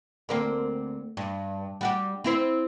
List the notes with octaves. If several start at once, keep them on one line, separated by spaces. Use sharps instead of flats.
D2 A#3 C4
G2
G3 F#4 G4
C4 E4 C5